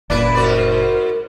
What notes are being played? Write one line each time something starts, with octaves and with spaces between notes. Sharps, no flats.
F#1 A#2 D4 E4 B4 D5
G#2 F#4 A#4 C5 D5